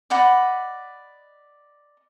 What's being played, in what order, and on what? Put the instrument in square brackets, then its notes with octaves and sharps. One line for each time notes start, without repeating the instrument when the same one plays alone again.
[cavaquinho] D5 D#5 F#5 B5